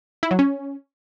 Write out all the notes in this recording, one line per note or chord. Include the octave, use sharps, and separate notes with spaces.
E4
F#3
C#4